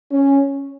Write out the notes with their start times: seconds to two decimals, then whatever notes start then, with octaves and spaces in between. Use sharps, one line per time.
0.12 C#4